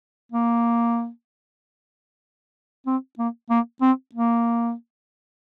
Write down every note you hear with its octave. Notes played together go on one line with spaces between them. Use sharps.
A#3
C4
A#3
A#3
C4
A#3